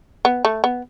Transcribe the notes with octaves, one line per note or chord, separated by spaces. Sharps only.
B3
A3
B3